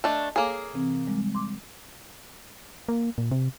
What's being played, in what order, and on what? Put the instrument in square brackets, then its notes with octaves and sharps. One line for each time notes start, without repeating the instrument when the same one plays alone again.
[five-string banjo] A3 D4 [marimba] D#5
[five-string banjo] A#3 G#4 [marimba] A4 C#5 D6
[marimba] C3 E3 C4
G3 G#3
C6 D6
[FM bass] A#3
A#2
C3